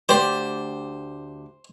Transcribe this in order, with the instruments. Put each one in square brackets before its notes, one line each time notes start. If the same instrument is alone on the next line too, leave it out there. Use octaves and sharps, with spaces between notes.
[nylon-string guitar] D2 G4 D5 [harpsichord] C5